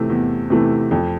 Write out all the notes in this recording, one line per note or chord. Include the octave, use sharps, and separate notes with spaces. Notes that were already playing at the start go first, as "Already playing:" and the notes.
Already playing: C3 E3 A3
E2
C3 E3 A3
F2